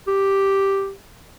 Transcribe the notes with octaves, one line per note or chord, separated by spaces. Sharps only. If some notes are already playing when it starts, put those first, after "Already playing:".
G4